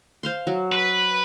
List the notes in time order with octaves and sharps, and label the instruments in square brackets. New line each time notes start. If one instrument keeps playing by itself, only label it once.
[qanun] C5 F5 C6
F#3
[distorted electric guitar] B4